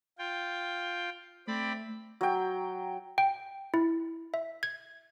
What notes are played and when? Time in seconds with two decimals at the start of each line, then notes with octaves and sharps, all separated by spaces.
0.18 F4 G5
1.47 A3 C4 D5 B5
2.21 F#3 G5
3.18 G5
3.74 E4
4.34 E5
4.63 G#6